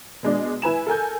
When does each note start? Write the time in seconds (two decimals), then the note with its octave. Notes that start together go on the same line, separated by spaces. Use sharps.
0.23 B2 G#3 D4
0.62 E4 B4 G#5 E7
0.87 A4 A#4 G#5 G6